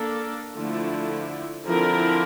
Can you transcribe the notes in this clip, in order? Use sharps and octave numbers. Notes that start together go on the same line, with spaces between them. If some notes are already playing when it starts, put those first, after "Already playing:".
Already playing: A#3 D4 A4
D3 F3 A3 E4
D3 F3 C4 E4 A#4